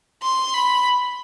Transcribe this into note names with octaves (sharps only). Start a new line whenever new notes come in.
C6
B5